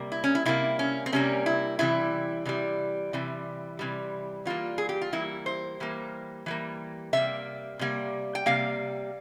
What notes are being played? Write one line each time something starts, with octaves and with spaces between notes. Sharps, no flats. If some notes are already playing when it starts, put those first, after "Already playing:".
Already playing: C3 G3 A#3
E4
C#4
E4
C3 G3 A#3 E4
C#4
C4
C3 G3 A#3 C#4
E4
C3 E3 G3 E4
C3 E3 G3
C3 E3 G3
C3 E3 G3
E3 G3 A#3 F4
G#4
G4
F4
E3 G3 A#3 E4
C5
E3 G3 A#3
E3 G3 A#3
C3 G3 A#3 E5
C3 G3 A#3
G5
C3 G3 A#3 F5